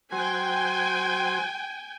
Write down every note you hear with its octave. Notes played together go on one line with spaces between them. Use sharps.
F#3 F#4 C5 G5 G#5